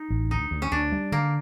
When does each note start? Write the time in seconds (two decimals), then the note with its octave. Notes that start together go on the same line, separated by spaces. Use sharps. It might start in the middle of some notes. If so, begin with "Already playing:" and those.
Already playing: D#4
0.10 A1
0.31 D2 D#4
0.51 D2
0.62 C#4
0.72 D2 D4
0.92 G3
1.12 D3 A#3